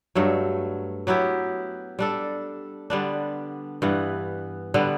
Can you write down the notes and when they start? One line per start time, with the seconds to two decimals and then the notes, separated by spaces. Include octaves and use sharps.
0.15 G2 F#3 A3
1.07 F#3 B3 E4 G4
1.99 G3 D4 A4
2.90 D3 G3 B3 D4
3.82 G2 E3 B3
4.74 D3 G3 B3